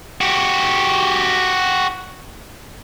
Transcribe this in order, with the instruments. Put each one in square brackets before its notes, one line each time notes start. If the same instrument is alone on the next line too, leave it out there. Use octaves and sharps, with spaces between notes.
[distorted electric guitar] F#4 G4